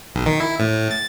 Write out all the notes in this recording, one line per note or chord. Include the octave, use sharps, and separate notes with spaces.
B1
D#3
E4
A2
A6